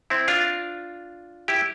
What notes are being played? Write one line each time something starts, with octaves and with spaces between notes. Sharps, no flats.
C4 E4
D4 F4
E4 G4